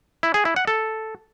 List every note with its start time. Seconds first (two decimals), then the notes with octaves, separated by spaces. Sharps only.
0.23 E4
0.34 G#4
0.45 E4
0.56 F#5
0.67 A4